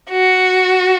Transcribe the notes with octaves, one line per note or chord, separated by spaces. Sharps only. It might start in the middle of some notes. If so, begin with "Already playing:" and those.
F#4